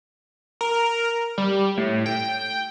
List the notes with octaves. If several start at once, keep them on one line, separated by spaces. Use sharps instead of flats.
A#4
G3
A2
G5